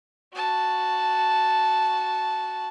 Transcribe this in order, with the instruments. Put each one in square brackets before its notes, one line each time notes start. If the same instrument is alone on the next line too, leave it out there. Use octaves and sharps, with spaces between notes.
[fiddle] F#4 A5